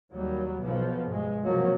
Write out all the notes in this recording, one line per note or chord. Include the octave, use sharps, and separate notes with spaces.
D#2 F#3 G3
B1 B2 F3 B3
G2 G#3
C3 F3 F#3 A#3